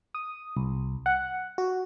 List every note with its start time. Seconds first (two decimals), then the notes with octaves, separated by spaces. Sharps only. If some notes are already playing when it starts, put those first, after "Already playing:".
0.15 D#6
0.57 C2
1.06 F#5
1.58 F#4